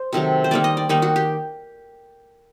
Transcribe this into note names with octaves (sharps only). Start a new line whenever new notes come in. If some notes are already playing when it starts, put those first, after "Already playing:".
Already playing: C5
C3 D#3 F#3 A3
C5
D#3 G3 A#3 D5
D#5
D5
D#3 G3 A#3 D#4
F#4
G4